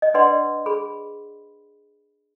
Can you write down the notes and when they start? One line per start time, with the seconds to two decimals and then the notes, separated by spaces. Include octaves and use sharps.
0.02 D#5
0.14 D4 B4 D5 D#5 F#5 C6
0.66 G#4 B5